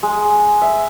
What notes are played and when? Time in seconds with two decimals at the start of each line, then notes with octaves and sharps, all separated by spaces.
0.03 G#3
0.61 E5